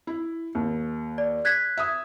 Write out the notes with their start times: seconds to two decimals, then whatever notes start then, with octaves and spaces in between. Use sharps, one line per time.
0.07 E4
0.55 D#2
1.18 D5
1.45 F#6 G#6 B6
1.77 E5 D#6